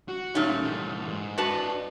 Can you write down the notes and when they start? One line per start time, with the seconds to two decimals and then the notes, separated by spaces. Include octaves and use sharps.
0.08 F#4
0.35 A#2 G3 A3 C#4 D#4
0.63 E3 G3
1.06 G#2
1.38 D4 F#4 B4 D#5 A5